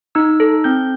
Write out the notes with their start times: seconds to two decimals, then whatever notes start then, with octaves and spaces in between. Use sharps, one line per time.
0.15 D#4 E6
0.40 A4
0.64 C4 G6